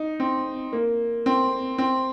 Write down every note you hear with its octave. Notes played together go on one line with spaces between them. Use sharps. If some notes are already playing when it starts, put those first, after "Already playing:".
Already playing: D#4
C4
A#3
C4
C4